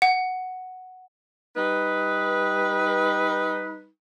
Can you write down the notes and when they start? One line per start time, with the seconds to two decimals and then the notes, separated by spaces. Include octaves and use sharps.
0.02 F#5
1.56 G3 D#4 B4